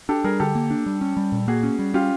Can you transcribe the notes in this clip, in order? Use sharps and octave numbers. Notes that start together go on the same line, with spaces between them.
D4 G4 A4
G3 G#4 A#4
D3 G4 A4
A#3
D4
G3
C#4
G3
A#2
A#3 F#4 G#4
C#4
G3
C#4 F4 G4